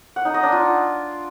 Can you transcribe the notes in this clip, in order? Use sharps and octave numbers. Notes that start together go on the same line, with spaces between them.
F#5
D#4
D#5
D4
F4